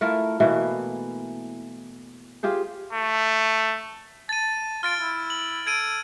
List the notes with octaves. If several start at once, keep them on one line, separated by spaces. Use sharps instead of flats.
A3 E4 F4 A#4
B2 E3 A3 A#3
F4 G4 G#4 C5
A3
A5 A6 D#7
F4 F6 A6 D7
E4
F#7
A4 G#6 D7 D#7